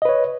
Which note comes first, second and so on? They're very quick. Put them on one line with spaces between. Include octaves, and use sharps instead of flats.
D#5 B4 C#5